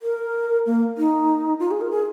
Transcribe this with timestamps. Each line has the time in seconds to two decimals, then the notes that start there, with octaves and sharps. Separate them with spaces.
0.02 A#4
0.66 A#3
0.98 D#4
1.60 F4
1.71 G#4
1.81 A#4
1.91 G#4